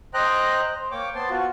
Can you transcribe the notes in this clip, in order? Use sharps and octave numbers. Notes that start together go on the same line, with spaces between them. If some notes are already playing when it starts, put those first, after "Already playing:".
C5 D#5 G5 A#5 F#6
C5
A#3 C#5 G5 D6
B3 C5 A5 C6
F4 F#4